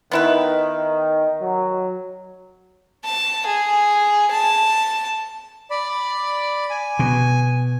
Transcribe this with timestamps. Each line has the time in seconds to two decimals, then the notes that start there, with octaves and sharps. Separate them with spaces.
0.11 D#3 B3 E4 B4
1.40 F#3
3.04 A5
3.47 G#4
4.31 A5
5.70 D5 B5
6.70 G#5
6.99 B2